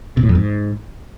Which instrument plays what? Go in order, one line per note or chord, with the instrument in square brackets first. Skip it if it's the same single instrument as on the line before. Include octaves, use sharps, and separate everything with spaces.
[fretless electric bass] C3
A2
F2
G#2